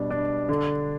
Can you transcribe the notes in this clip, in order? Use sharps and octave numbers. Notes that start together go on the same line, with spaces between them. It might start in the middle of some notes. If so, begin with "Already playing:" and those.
Already playing: B2 G3 D4
D4
D3